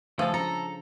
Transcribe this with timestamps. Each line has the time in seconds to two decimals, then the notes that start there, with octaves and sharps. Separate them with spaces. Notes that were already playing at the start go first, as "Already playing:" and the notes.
0.19 C#3 F3 A3 G#4 A4 C5
0.34 G#3 C#4 D4 A4 A#5